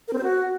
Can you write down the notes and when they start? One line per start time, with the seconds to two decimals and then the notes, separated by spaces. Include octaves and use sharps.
0.08 A#4
0.13 C4
0.18 C5
0.23 F#4